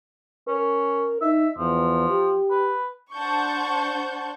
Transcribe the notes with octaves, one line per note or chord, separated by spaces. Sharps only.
C#4 A#4
D#4 E5
E2 F3
G4
B4
D4 C5 F#5 A5 C#6 G6